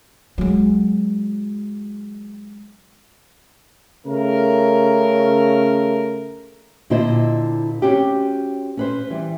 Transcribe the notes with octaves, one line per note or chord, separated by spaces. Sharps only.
F#3 G#3
C#3 A3 A#4
A#2 D3 E4 F4 C5 D#5
C4 C#4 F#4 G4
C#4 B4 C5
E3 G3